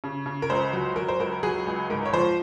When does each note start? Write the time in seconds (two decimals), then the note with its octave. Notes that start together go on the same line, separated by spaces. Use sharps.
0.04 C#3
0.26 C#3
0.42 A#4
0.50 C#2 C5
0.73 F#3
0.96 F#3 A#4
1.08 C5
1.19 C#2 A#4
1.43 F#3 G#4
1.67 C#2
1.90 G#2 A#4
2.05 C#5
2.13 F3 C5